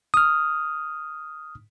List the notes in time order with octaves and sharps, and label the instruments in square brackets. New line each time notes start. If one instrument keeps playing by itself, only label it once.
[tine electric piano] D#6 F6